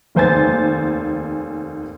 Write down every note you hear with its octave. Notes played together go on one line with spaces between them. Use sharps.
F1 D#2 C5 G#5 A6